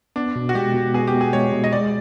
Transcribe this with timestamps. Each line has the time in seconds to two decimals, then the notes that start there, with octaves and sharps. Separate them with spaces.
0.16 B3 D4
0.36 B2
0.49 F#4
0.55 G#3 G4
0.74 B2
0.94 B3 G#4
1.07 G4
1.13 B2
1.21 G#4
1.33 G#3 C#5
1.53 B2
1.64 D#5
1.72 G#3 D5